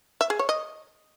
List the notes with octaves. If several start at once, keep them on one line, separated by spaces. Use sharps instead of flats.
E5
G#4
C#5
D#5